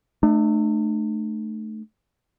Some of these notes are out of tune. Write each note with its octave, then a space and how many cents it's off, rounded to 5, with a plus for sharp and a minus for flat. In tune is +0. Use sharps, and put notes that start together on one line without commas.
A3 -10 D4 +45